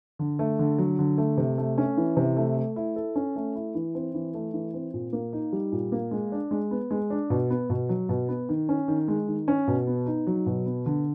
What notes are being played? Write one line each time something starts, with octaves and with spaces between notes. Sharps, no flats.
D3
A3
D3
F#3
D3
A3
C3
A3
C#4
E3
C3
A3
A3
E4
A4
C#4
A3
E4
E3
C4
E3
A3
E3
C4
A#2
A#3
D#4
G3
A#2
A#3
G#3
D4
G#3
B3
G#3
D4
B2
B3
B2
F#3
B2
B3
D#3
C#4
D#3
G#3
D#3
C#4
B2
B3
D#4
F#3
B2
B3
D3